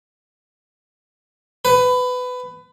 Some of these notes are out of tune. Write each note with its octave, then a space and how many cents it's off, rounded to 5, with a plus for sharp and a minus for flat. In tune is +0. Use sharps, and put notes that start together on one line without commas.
B4 +20